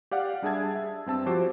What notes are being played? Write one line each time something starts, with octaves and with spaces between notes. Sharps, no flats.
G4 D5 F5 F#5
G3 D4 G#4 E5 A5 G#6
E5
G2 C4 A5 E6
F3 F#4 G4 C5 D6